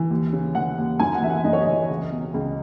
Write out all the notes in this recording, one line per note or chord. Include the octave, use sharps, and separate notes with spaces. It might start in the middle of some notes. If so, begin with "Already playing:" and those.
Already playing: E3
D#2
C#3
E3 F#5
D#2
F#2 G#5
F#5
E3 E5
F#5
F#2 D#5
C#5
D#5
E3
C#2
B2
C#2